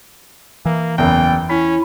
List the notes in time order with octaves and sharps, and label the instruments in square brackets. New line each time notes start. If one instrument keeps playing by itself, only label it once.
[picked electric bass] E3 [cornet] A#3
[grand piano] F#1 E2 [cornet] G5
[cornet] C#4 [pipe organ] E4 [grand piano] B6